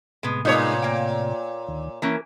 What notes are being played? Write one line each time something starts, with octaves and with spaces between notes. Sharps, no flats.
A2 C3 G#3 B3
A#2 G#3 B3 D#4 C#5
A#3 G5
D2 D#3
E3 A#3 C#4 A#4